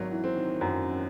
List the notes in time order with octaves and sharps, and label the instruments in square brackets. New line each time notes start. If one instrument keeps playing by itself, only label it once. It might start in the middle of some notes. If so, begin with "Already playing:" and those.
Already playing: [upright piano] G#1 [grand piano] F#3
[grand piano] E3
[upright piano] C4
[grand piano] D#3
[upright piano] F#2